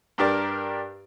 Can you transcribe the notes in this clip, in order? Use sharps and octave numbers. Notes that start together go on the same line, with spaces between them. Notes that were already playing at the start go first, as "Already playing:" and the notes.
G2 D4 G4 A#4 D5